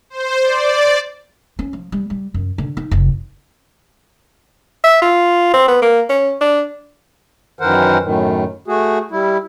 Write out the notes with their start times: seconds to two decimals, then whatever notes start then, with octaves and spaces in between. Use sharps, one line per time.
0.10 C5
0.43 D5
1.59 C#4
1.73 F3
1.92 G3
2.10 G3
2.34 F#2
2.58 D3
2.77 D#4
2.91 F1
4.84 E5
5.02 F4
5.53 C4
5.68 B3
5.82 A#3
6.09 C#4
6.41 D4
7.59 F#2 D#3 E3 A#4 C5 F#5
8.02 F#2 A2 D#3
8.68 A3 F#4 G#4
9.11 G3 E4